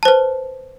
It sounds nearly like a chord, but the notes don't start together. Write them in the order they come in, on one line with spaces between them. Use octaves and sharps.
A5 C5 B4